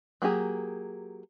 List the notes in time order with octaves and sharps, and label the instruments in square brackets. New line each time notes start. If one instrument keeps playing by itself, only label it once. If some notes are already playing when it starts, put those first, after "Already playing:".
[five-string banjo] F#3 A#3 G4 G#4